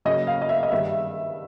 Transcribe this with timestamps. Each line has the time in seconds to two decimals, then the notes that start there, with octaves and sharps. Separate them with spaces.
0.05 C#3 F#3 A#3 C#4 D#5
0.27 F5
0.42 D#5
0.49 E5
0.63 D#5
0.72 G2 D#3 G3 E5